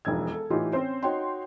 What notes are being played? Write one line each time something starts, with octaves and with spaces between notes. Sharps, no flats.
E1 B1 F2 E6 G#6
A4
A2 E3 D#4 F4 G4
C4 C#4 C5
D#4 F#4 C#5 G5 C6